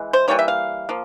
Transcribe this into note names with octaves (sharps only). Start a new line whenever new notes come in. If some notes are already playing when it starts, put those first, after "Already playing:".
Already playing: E3 G#3
C5
E3 G3 A#3 C#5
E5
F5
F3 A#3